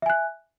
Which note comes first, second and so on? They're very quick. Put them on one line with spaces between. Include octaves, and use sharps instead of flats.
E5 G#5 F#6